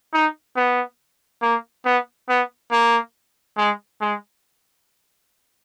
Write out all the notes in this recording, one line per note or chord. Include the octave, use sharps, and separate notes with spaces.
D#4
B3
A#3
B3
B3
A#3
G#3
G#3